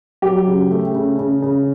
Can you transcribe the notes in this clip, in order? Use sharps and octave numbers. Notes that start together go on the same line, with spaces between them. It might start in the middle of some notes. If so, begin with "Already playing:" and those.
F#3 G4
C#3
A3
C#3
C#3
C#3